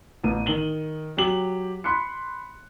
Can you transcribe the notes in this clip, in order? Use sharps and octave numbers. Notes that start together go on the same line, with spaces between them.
A1 A2 B3 D#7
D#3 F#7 G7
F#3 G4 F#7
B5 C6 F#6 C#7